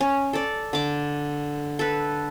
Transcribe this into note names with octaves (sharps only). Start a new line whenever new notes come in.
C#4
A4 D5
D3 D6
A4 B4